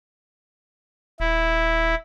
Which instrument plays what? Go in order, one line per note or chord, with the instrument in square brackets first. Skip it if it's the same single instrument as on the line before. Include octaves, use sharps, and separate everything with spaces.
[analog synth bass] D#1 [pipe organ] E4